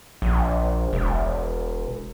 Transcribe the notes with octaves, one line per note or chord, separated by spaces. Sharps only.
A#1
E1